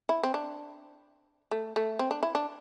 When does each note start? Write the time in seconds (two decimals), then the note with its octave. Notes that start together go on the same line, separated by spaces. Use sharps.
0.09 E4
0.23 C4
0.34 D4
1.51 A3
1.76 A3
1.99 C4
2.11 D4
2.23 E4
2.35 D4